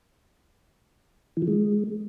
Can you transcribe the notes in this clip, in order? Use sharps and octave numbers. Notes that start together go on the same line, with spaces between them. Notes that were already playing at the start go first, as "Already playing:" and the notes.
E3
F3
G#3